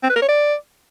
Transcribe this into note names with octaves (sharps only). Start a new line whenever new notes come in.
C4
B4
A#4
C#5
D5